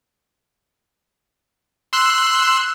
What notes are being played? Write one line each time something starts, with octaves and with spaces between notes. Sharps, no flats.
C6 E6 F#6